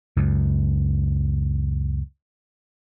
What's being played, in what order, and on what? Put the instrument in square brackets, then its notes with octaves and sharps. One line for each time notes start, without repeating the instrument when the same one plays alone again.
[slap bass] C#2 F#2